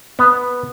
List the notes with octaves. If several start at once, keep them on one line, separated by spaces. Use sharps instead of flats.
B3